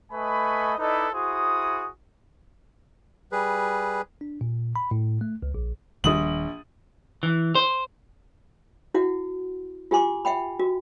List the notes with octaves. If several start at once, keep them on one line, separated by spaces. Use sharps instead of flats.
A3 B4 D#5 G#5 B5 C#6
D#4 E4 A4 B4 D5 D#5
E4 F#4 G#4 C5 D#6
G3 G#4 B4
D4
A#2
B5
A2
A3
C#2
A#1
D#1 A#1 D#3 G3 D#6 F#7
E3
C5
E4 F#4 F#5
F4 G4 G#5 C6 D6
E5 F#5 G5 B5
F#4